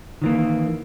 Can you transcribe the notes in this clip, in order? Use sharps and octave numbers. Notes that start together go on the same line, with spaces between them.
D#3 E3 A#3